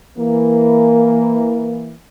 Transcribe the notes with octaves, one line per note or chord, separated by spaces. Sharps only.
E3 A#3